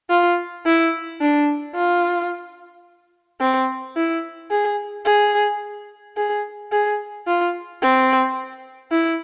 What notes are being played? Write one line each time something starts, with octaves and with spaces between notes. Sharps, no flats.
F4
E4
D4
F4
C4
E4
G#4
G#4
G#4
G#4
F4
C4
E4